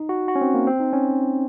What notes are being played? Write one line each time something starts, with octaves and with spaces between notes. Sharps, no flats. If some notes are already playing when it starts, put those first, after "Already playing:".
Already playing: D#4
F#4
F#4
C#4
C4
A#3
C4
D#4
C#4